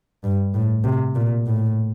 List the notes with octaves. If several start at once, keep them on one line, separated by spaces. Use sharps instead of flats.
G2
A2
C3
A#2
A2